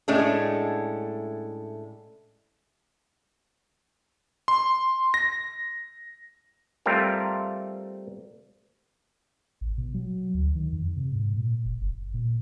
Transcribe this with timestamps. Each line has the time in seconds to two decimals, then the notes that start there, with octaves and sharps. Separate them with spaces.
0.08 A2 G#3 A3 C#4 D4
4.48 C6
5.14 A#6
6.86 G3 A3 C4 F4 A#4
9.61 A1
9.78 B2
9.94 F#3
10.34 D2
10.55 D#3
10.73 F2
10.97 C3
11.12 G#2
11.35 A#2
11.65 F#1
11.82 F#1
12.14 A#2